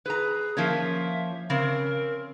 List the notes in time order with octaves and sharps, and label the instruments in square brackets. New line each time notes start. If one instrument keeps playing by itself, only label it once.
[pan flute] G#4 [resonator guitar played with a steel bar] B4 A#5
[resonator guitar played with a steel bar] F3 A#3 C#4 [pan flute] E5
[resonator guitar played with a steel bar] C#3 C4 [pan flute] A#4